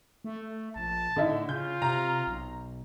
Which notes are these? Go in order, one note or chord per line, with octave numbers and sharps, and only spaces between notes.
A3
A#1 A5
A2 D3 D#4 E4
C#3 F4 G6
C3 A#5
B1